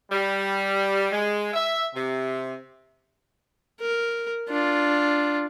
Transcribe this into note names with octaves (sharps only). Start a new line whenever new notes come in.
G3
G#3
E5
C3
A#4
D4 F4